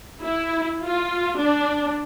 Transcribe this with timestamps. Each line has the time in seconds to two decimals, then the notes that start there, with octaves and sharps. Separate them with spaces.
0.23 E4
0.84 F4
1.40 D4